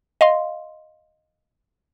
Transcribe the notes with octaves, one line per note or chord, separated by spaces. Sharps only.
D#5 F5 C6